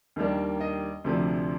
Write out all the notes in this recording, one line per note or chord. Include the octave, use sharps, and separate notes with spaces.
D#2 D#3 G3 A#3 D4
D#5
D2 C3 F3 A3 D4